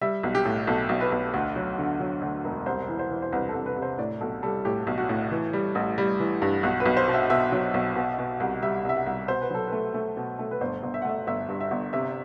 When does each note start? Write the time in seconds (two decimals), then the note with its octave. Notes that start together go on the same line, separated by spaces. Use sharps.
0.01 G3 E5
0.23 B1
0.35 G4
0.45 A2
0.67 B1 A4
0.89 B1
1.01 B4
1.12 B1
1.34 D2
1.56 F#3
1.78 D3
2.00 F#3
2.22 D2
2.44 E1
2.66 C2 C5
2.89 E3
2.99 C5
3.10 E3
3.22 C5
3.32 C2 B4
3.49 A4
3.55 C2
3.66 B4
3.77 C3
3.82 C5
3.98 A2 D5
4.21 B1 A4
4.43 G3 A4
4.65 A2 G4
4.87 B1
4.98 F#4
5.09 A2
5.31 E3
5.53 G3
5.75 A1
5.98 G3
6.20 E3
6.42 G2
6.63 B1 F#4
6.80 B4
6.86 B1
6.97 C5
7.08 B2
7.14 E5
7.30 B2 E5
7.52 F#3
7.74 B1
7.96 B2
8.18 B2
8.40 C2
8.62 G3 E5
8.85 C2 E5
8.96 F#5
9.06 C2
9.28 B2 C5
9.41 B4
9.51 F#3 A4
9.68 A3 B4
9.94 A3
10.17 B2
10.39 A3
10.51 B4
10.61 G1 C5
10.83 G1
10.94 E5
11.02 F#5
11.05 A3 E5
11.27 G1 E5
11.49 G2
11.61 E5
11.71 G1
11.93 C3 E5